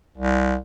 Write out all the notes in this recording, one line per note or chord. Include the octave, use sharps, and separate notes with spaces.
C2